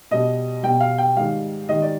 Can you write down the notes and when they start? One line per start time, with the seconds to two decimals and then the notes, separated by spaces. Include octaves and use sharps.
0.11 B2 G3 D#5
0.63 B2 G3 G5
0.81 F5
0.98 G5
1.16 G#2 D#3 G3 F5
1.69 G#2 D#3 G3 D#5
1.82 D5